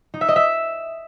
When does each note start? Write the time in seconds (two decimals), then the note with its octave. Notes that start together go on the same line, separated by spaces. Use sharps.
0.14 D#4
0.21 E5
0.28 D#5
0.36 E5